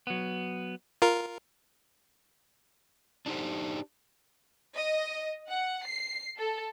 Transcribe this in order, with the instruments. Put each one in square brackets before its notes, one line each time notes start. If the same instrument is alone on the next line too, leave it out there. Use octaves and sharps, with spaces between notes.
[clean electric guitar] F#3 B3
[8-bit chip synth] F4 A#4
[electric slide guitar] D4 D#4 G4 C5
[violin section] D#5
F#5
C7
A4